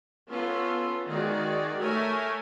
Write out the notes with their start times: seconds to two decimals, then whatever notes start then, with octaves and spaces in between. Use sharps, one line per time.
0.30 B3 C#4 F4 A4
1.07 D#3 G#3 F#4 G#4 D5
1.80 A3 A#4 C#5 E5 G#5